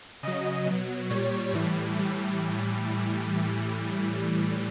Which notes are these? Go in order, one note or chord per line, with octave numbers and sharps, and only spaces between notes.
C#3 F#3 D#5
B2 F#3
A#2 G3 C#5
A2 E3 G3
A2 E3 G3